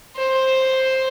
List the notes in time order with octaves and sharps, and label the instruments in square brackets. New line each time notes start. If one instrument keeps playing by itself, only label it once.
[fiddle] C5